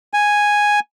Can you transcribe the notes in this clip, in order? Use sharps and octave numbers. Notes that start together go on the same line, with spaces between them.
G#5